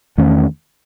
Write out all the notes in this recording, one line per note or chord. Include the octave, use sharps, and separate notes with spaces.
E2 D#3 A3 C#4